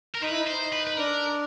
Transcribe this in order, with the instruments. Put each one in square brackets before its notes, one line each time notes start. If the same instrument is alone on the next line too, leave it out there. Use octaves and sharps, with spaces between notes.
[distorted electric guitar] A#4
[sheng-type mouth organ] D#4 [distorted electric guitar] B4
[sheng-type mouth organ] E4
D#4
[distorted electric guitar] C5
B4
B4
[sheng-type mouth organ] D4 [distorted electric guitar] A#4